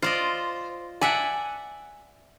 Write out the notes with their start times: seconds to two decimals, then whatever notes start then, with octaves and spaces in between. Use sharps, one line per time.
0.02 F4 C5 D5 D#5
1.01 D5 E5 F#5 G#5